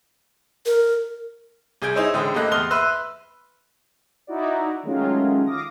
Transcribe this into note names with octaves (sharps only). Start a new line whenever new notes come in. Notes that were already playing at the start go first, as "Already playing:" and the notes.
A#4
C2 G#4 G6 G#6 D7
D#4 E4 G#4 C5 C#5 E5
A1 D3 G#3 C5 G5 D#6
A2 A#3 G4 A4 D#5 F#6
E2 C6 D#6 F6 G7
B4 E5 B5 C6 E6 F#6
D#4 E4 F#4 D5
D#3 F#3 G#3 A3 C#4 F4
F5 D6 D#6 A#6